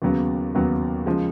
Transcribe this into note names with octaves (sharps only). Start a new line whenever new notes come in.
D#2 C#3 F#3 B3
D#2 C#3 F#3 B3
C#3 F3 G#3